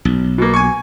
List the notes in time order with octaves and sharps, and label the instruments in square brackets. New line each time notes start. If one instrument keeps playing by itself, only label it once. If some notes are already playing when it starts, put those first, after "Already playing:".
[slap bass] B1
[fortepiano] B2 A#3
G#5 C#6